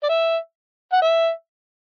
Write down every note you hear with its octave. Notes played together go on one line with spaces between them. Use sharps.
D5
E5
F#5
E5